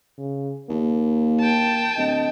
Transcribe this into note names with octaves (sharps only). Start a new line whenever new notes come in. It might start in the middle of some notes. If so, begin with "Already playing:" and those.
C#3
D#2 A#3
G5 A5
D1 D#5